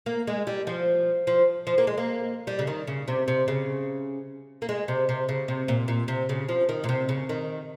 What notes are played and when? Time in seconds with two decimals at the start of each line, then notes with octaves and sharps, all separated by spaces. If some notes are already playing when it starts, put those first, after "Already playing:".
0.06 A#3
0.27 G#3
0.47 G3
0.67 F3
1.27 F3
1.67 F3
1.78 A#3
1.87 G#3
1.98 A#3
2.47 G3
2.59 C#3
2.67 D#3
2.87 C#3
3.08 C3
3.28 C3
3.48 C#3
4.62 A#3
4.69 G#3
4.88 C3
5.09 C3
5.29 C#3
5.48 C3
5.68 A#2
5.88 A#2
6.08 C3
6.29 C#3
6.49 F3
6.69 D#3
6.84 A#2
6.89 C3
7.09 C#3
7.29 D#3